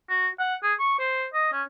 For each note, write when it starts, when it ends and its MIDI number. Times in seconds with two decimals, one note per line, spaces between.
0.09 0.28 66
0.39 0.55 78
0.63 0.73 68
0.79 0.96 85
0.99 1.26 72
1.33 1.50 75
1.52 1.63 61